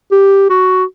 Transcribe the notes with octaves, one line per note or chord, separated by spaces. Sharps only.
G4
F#4